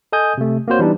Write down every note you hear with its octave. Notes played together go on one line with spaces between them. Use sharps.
A4 D#5 G#5 D#6 G6
C3 A3
A#3 C4 F#4 C5 C#5
E3 G3 B3 D4 D#4